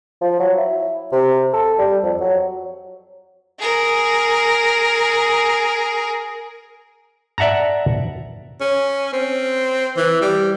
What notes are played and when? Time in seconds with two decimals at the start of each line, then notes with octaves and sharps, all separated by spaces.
0.21 F3
0.39 F#3
0.57 E4
1.12 C3
1.53 A4
1.79 G3
2.03 F2
2.20 F#3
3.59 G#4 A#4
7.38 D5 E5 F#5 A5 A#5
8.60 C#4
9.13 C4
9.97 E3
10.21 G3